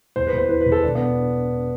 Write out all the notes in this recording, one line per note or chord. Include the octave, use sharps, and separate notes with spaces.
E2 C5
B4
E2
C5
E3 B4
B4
E2
A4
E1 D4
B3